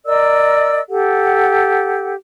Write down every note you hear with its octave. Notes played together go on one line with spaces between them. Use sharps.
A#4 D5 D#5 E6
G4 A4 F#5